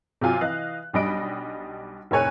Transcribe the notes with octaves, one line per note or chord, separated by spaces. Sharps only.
C3 F#3 F4 G#5
E3 D#5 F5 F#6
B1 G3 D4 D#5 B5 D7
F1 A2 A#4 C#5 G#5 F#6